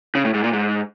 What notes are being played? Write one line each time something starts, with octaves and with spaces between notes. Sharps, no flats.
C#3
A2
G#2
A#2
G#2